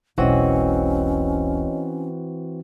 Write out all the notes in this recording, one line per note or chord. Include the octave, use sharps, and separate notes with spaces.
E1 B1 E3 C4 C#4 F#4 C#5 D#5